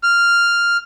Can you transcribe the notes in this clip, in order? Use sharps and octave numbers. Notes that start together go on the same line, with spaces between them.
F6